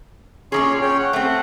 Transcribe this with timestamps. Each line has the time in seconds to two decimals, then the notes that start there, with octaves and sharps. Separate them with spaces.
0.52 A#2 D#3 C#4 G#4 C#5 C6
0.82 C#4 C#5 G5
1.00 F#5
1.13 A3 C4